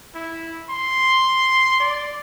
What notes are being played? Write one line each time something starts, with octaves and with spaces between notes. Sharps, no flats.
E4
C6
D5